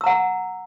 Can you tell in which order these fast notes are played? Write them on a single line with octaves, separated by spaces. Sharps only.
E6 A#5 F#5